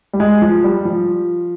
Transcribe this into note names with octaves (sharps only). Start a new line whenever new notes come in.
G3
G#3
F3
G3
F3